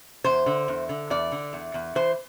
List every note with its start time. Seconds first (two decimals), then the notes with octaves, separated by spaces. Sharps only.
0.24 E2 C5
0.46 D3
0.68 E2
0.89 D3
1.10 E2 D5
1.32 D3
1.53 E2
1.74 E2
1.95 E3 C5